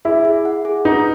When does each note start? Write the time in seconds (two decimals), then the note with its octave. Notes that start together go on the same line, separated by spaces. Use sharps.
0.05 E4 G#4
0.25 G#4
0.45 F#5
0.65 G#4
0.85 D#4 B4